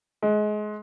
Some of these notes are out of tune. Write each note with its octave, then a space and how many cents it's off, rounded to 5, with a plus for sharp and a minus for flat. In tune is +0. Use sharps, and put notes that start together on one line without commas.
G#3 +25